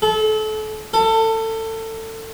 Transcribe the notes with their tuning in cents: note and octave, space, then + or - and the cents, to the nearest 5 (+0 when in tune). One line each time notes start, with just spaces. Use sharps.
A4 -30
A4 +25